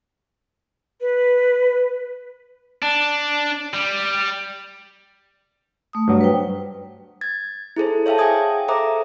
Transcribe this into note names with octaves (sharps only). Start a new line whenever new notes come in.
B4
D4
G3
A3 D#6
G2 F#3
B4 C5 G5
G#6 A6
E4 G#4 A4 C5
C#5 E5 F5 G5 A5
G#4 G5 G#5 D#6 G#6
A4 C5 E5 A#5 D6 D#6